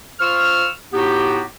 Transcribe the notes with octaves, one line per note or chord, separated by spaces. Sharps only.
F4 C5 C#6 E6 F6
A2 B3 D#4 F#4 G4